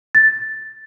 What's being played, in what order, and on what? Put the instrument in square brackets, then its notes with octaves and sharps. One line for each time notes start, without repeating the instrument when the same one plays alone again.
[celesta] A6